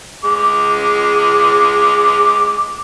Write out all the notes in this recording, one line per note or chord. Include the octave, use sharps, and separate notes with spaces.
G#3 D6